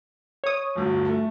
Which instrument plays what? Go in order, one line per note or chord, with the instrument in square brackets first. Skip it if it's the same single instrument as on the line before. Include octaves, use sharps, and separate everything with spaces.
[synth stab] C#5 D#6
[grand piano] D1 G1
A3